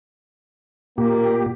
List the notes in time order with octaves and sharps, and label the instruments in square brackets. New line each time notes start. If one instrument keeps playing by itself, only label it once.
[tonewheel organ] A#2 G4 [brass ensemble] A#3